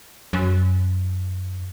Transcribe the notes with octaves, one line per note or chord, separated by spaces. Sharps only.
F#2